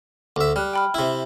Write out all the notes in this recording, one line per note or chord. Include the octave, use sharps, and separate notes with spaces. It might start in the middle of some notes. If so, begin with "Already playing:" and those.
D2 E5
G3 F6 F#6
G5 B5 F6
C3 E4